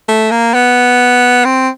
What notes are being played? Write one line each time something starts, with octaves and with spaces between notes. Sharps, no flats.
A3
A#3
B3
C4